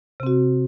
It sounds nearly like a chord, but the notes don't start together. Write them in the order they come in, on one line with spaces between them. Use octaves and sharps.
C3 C4 F#4